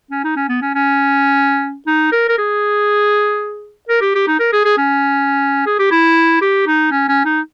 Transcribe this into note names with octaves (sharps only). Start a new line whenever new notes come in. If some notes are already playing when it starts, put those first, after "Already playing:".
C#4
D#4
C#4
B3
C#4
C#4
D#4
A#4
A#4
G#4
A#4
G4
G4
D#4
A#4
G#4
G#4
C#4
G#4
G4
E4
G4
D#4
C#4
C#4
D#4